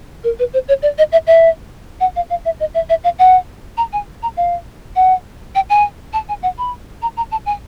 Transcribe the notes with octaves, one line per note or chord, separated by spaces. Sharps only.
A#4
B4
C5
C#5
D5
D#5
E5
E5
F#5
F5
F5
E5
D#5
E5
E5
F5
F#5
A#5
G#5
A#5
F5
F#5
G5
G#5
A5
G#5
F#5
B5
A#5
A#5
A5
G#5